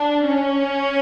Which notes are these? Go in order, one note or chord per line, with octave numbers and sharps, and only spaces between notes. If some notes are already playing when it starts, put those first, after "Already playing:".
Already playing: D4
C#4